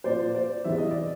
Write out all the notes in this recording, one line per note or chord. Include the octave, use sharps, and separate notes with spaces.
A#2 F3 C5 D5
C5 D5
E2 C3 E3 E5
D#5
D5